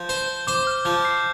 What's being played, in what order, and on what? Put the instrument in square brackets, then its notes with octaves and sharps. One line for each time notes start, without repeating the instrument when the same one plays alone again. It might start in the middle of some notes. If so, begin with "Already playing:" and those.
Already playing: [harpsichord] F3 [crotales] G6
[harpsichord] C5
[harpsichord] C5 [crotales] D6
[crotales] F6
[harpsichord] F3 [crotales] G6
[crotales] C7